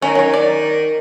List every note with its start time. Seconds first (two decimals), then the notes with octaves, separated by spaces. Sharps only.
0.02 D#3 C#4
0.15 F#3 C#5
0.34 D5